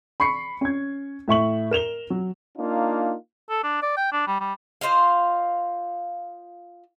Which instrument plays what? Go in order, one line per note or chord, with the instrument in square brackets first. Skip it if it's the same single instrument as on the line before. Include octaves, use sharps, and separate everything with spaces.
[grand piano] B5 C#6 C7 C#7
C#4 G#6
A2 E5 C#6 F#7
A#4 E7 F7 G7
F#3
[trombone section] A#3 D4 D#4 F4
[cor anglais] A4
D4
D5
G5
D4
G3
G3
[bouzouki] F4 C5 D#5 F5